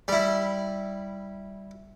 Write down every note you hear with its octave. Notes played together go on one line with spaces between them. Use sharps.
G3 E4